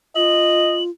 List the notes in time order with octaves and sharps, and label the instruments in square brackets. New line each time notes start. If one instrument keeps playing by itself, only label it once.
[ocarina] F4 [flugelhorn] D#5 [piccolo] F#7